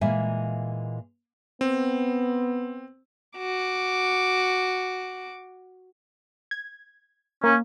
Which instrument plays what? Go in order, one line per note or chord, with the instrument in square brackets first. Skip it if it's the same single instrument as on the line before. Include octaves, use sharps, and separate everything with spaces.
[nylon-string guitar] A#2 E3 G#3 A#3 E5 G#5
[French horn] B3 [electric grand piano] C4
[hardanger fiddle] F#4 D6
[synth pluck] G#6
[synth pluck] A#3 [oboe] C#4